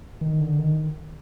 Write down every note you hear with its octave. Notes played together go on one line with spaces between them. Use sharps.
D#3
D3
D#3